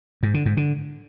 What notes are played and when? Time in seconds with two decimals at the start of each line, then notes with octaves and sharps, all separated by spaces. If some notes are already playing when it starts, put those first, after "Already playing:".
0.23 G#2
0.34 D3
0.46 G#2
0.57 D3